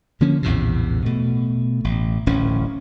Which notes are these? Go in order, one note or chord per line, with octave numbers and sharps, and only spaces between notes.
D3 F3 A#3 C#4
A#1 E2 A2 C3
B2 A3
A1
D1 A1 C#4